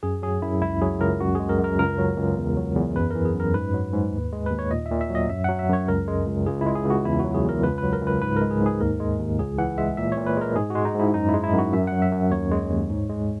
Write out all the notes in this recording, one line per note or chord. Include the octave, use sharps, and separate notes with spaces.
F#2 G#4
F#3 G#4
F#2 E4
C#2 E4
F#3 G#4
C#2 A#4
F#2 F#4
G#3 G#4
A#4
F#2
A#4
C#2 A#4
F#3
C#2
E2
F#3
E2
F#2 B4
E3 A#4
G#4
F#2 A#4
G#2 B4
F#3
G#2
D#2
G#3
B4
D#2
C#5
A#2 D#5
E5
A#2
E5
F#3
D#5
F#2 E5
F#3 F#5
E5
F#2 C#5
C#2 A#4
G#3
C#2
C#2 G#4
G#3 E4
G#4
C#2
F#4
E2 E4
F#4
F#3
G#4
E2 A#4
C#2 B4
B4
F#3
A#4
C#2 B4
G#2 B4
G#3 A#4
G#4
G#2 G#4
D#2 A#4
G#3
D#2
C#2 G#4
E3 F#5
G#3 E5
A#2 E5
A#2 C#5
B4
G#3 A#4
G#2 G#4
G#3 F#4
D#4
G#2 E4
F#2 D#4
G#3 E4
E4
F#2
F#4
F#2 E5
F#3 F#5
E5
F#2
D#2 C#5
G#3
D#2
G#2
G#3